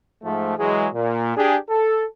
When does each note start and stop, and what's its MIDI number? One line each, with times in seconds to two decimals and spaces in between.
0.23 0.55 44
0.23 0.55 53
0.23 0.55 57
0.58 0.87 52
0.58 0.87 54
0.58 0.87 56
0.94 1.36 46
1.36 1.56 62
1.36 1.56 67
1.36 1.56 68
1.69 2.04 69